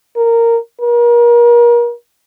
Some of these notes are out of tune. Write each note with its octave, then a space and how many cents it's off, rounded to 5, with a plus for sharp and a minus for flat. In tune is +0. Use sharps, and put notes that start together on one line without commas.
A#4 -10
A#4 +35